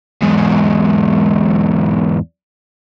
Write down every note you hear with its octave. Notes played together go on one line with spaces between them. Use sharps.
E2 G#2